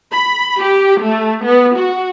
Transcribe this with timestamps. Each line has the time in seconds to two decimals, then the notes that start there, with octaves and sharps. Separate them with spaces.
0.12 B5
0.59 G4
1.02 A3
1.44 B3
1.76 F#4